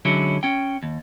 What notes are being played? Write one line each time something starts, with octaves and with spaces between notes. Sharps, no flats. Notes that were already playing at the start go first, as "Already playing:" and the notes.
D3 F#3 G#3 C#4 E4
C#4 G5
D#2